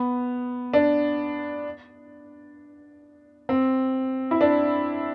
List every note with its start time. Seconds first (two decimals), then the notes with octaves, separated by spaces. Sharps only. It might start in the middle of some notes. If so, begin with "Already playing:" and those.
Already playing: B3
0.74 D4
3.49 C4
4.31 E4
4.41 D4